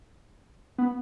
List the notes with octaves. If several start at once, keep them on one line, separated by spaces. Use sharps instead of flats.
B3